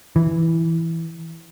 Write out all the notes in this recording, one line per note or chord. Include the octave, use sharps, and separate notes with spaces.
E3